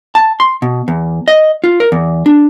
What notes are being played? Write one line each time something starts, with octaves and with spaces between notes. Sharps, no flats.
A5
C6
B2
E2
D#5
F4
A#4
E2
D4